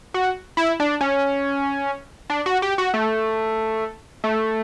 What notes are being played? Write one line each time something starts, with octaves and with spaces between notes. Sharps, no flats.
F#4
E4
D4
C#4
D4
F#4
G4
F#4
A3
A3